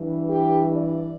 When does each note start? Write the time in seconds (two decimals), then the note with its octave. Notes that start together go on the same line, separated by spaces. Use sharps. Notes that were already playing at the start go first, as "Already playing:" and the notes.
Already playing: G2 E3
0.28 G4
0.70 D5